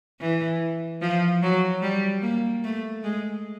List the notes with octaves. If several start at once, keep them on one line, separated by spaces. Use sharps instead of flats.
E3
F3
F#3
G3
A#3
A3
G#3